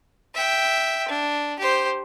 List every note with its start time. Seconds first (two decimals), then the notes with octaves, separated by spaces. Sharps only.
0.34 E5 G5
1.08 D4
1.59 G4 C5